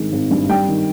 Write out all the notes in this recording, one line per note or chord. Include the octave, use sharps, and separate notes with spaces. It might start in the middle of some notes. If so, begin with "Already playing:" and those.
Already playing: G#1 G2 D#3 G#3
G#1
G2
G3 G5
D#3